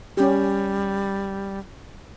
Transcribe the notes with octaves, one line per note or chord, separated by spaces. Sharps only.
G3 C#4 G4